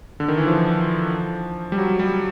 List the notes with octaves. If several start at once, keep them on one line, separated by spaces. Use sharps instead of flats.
D3
D#3
E3
F3
G3
F#3
G3